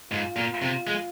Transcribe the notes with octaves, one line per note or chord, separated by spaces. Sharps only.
G#2 F4
A#2
C3
G#3